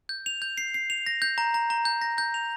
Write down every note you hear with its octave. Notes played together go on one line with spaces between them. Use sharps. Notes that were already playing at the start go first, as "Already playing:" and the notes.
G6
F7
G6
C7
C7
F7
A#6
G6
A#5
A#5
A#5
G6
A#6
G6
F7